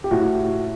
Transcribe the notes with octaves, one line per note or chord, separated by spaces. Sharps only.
G4
A2 F#4